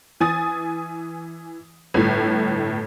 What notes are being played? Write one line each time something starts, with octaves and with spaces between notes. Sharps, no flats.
E3 G#5 D#6 A6
G1 A2